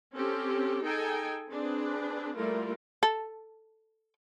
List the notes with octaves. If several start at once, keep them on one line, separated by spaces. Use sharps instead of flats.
C4 C#4 G4 A4
D#4 G#4 A4 G5 G#5
C4 D4 G#4 B4
G3 A3 A#3 E4 F4 A#4
A4